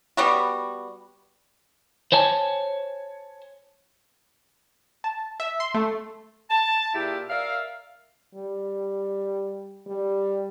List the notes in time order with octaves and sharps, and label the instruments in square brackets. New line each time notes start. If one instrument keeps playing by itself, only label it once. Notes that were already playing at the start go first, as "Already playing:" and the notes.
[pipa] G3 B3 F#4
[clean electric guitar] C5 C#5 G#5 A5
[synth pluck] A5
E5
C6
A3
[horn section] A5
A#2 E4 G4 G#4 E5
A#4 D5 E5 F5
[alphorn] G3
G3